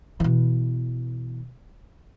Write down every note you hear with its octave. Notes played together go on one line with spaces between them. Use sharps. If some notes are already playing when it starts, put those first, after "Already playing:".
B2 E3